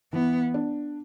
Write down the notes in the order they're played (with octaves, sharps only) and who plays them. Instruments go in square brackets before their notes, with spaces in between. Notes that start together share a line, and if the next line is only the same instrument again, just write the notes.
[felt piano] E3 [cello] B3
[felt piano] D4